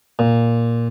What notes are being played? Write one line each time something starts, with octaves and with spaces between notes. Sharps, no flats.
A#2